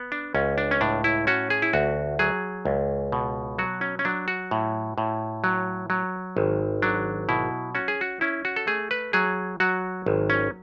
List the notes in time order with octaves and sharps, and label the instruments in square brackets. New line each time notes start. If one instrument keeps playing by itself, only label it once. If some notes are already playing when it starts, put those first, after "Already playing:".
Already playing: [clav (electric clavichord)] B3
D4
C#2 C#4
D4
C#4
A2 D4
E4
C#4 F#4
G#4
E4
D2 F#4
F#3 G#4
C#2
B2
F#3 F#4
C#4
C#4
F#3 D4
F#4
A2
A2
F#3
F#3
G#1
F#3 D4
B2 E4
C#4 F#4
G#4
F#4
C#4 E4
F#4
A4
A3 G#4
B4
F#3 G#4
F#3 F#4
G#1
C#4